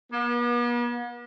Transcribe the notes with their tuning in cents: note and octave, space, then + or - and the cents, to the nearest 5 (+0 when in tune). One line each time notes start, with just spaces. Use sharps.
B3 -45